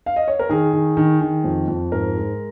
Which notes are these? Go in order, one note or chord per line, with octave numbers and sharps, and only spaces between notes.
F5
D#5
C#5
A#4
D#3 G#4
D#3
D#3
D#3
F2
F2
G#2 A#4
G#3